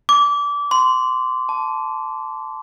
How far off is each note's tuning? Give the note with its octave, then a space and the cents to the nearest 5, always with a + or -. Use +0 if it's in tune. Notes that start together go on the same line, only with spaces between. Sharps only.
D6 -25
C6 -20
A5 -10